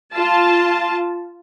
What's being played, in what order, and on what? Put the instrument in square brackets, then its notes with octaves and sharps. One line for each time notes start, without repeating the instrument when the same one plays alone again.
[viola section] F4 A5